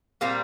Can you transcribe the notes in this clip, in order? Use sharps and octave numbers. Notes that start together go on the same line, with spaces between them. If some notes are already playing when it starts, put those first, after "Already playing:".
A#2 G3 A#3 C4